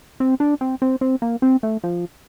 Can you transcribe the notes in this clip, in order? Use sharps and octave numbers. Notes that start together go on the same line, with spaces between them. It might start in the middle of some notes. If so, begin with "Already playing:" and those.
C4
D4
C4
C4
C4
A#3
C4
A3
F3